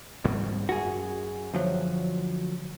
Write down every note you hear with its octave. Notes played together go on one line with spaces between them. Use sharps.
G#2 G3 C4
F#2 F#4 G#4
D2 F3 F#3